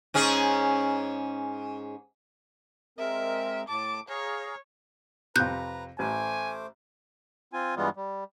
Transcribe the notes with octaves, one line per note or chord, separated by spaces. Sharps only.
G#2 C#4 G#4
G#3 C4 A#4 E5
A2 A5 D6
G#4 C#5 F5 A#5
F2 C3 B4 A#5 F#6 G6
A1 A3 C5 G#5 D6
C4 F4 G#5
G2 E3 G3 G#3 B3 F4
G3